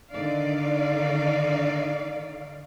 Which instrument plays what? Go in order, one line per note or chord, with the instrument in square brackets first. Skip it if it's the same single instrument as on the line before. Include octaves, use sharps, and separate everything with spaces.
[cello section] D3 D#3 D#4 D5 F5